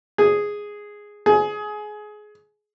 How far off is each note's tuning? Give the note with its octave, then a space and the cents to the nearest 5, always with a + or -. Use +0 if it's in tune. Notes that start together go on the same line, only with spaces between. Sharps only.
G#4 -5
G#4 +20